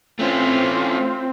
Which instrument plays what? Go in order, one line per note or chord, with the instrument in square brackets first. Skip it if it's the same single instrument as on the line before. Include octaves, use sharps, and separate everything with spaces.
[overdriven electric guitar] A3 C#4 [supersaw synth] C4 [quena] F4